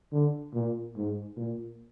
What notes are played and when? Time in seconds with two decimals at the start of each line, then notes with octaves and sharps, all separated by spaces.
0.12 D3
0.54 A#2
0.96 G#2
1.37 A#2